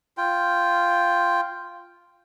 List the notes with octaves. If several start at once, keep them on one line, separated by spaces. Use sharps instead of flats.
F4 G5